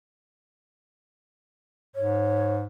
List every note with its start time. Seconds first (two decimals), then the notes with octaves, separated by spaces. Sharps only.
1.96 G#2 C#5